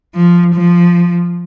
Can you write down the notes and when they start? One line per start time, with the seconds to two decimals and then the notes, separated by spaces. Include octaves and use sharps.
0.15 F3
0.55 F3